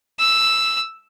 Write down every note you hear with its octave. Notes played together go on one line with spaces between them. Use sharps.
E6